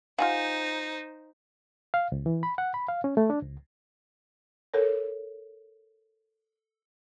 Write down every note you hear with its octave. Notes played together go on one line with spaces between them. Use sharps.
D#4 F4 G4 C5 F5 F#5 G#5
F5
C#2
E3
B5
F#5
B5
F5
C#4
A3
D4
C#2
A4 A#4 C#5